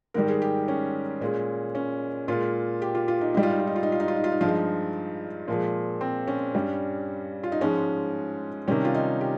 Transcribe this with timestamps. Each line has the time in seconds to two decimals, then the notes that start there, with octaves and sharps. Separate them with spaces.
0.14 G#2 D#3 G3 A#4
0.28 G#4
0.42 G4
0.68 C#4
1.21 A#2 G#3
1.75 C#4
2.28 A#2 G#3 F4
2.82 G4
2.95 F4
3.08 F4
3.21 D#4
3.34 G#2 G3 D#4
3.43 F4
3.51 D#4
3.59 F4
3.67 D#4
3.76 F4
3.83 D#4
3.92 F4
4.00 D#4
4.08 F4
4.16 D#4
4.24 F4
4.32 D#4
4.41 G2 F3 G#3 F4
4.48 D#4
5.48 A#2 F3 G#3
6.01 C4
6.27 C#4
6.55 G2 G3
7.43 F4
7.52 D#4
7.61 G#2 F3 G#3 C#4
8.68 C3 D#3 G3 C#4
8.85 F4
8.94 D#4
9.21 G4